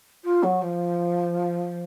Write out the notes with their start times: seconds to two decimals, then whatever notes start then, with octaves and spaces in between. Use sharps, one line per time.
0.24 F4
0.43 F#3
0.62 F3